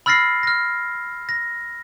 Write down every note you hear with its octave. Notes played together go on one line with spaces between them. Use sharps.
B5 E6 F6 A6 A#6 C7
F6 A#6
A#6